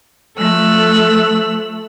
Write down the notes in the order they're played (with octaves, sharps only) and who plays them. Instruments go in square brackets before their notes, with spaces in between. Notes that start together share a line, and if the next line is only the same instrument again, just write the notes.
[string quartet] F3 A3 A4 E6 F#6